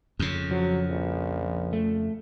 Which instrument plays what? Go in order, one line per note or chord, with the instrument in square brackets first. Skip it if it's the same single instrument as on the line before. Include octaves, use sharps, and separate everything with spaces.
[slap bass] F2 C#3
[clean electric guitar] F3 [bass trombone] F#3
[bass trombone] A#1
[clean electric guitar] A3